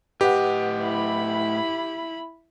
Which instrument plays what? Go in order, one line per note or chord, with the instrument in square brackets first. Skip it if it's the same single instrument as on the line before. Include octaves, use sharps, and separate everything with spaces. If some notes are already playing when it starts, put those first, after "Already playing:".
[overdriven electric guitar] A2 D#5 [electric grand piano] G4 [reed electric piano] B4 F#5
[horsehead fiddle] E4 B5